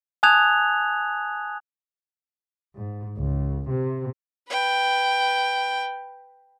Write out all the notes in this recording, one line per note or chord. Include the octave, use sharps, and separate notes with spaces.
G#5 A5 D#6 F#6 G#6 F7
G#2
C#2
C3
B4 G5